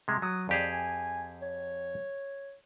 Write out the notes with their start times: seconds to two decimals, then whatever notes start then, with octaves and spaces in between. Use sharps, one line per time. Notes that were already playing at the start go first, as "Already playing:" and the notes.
0.08 C3 G#3
0.22 F#3 D#6
0.49 F2 G4 G#4 D5
0.72 G#5
1.42 C#5